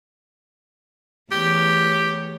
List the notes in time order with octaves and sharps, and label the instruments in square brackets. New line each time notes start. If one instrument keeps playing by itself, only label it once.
[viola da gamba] E2 A3 C#5 [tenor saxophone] G4